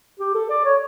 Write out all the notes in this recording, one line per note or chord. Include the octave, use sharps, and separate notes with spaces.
G4
A4
D5
C#5